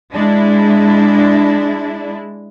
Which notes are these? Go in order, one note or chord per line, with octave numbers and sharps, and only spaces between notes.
G#3 D4 E4